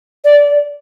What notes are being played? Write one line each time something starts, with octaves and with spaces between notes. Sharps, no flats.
D5